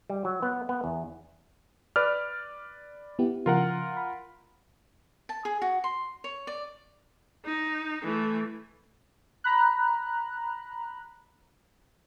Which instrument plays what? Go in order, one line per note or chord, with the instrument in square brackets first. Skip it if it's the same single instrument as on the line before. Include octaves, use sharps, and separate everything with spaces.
[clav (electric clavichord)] G3
F#3
B3
B3
E2
[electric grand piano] B4 D5 F6
[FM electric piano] B3 E4 G4
[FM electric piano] C#3 F3 [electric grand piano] F4 A#4 F#5
[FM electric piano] B5
[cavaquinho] A5
G#4
F#4
C6
C#5
D5
[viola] D#4
E3 A3
[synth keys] A#5 B5 F#6